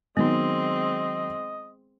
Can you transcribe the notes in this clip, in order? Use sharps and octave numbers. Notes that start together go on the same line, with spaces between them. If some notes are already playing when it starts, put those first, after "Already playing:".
D#3 F#3 G#3 B3 C4 D#4 D#5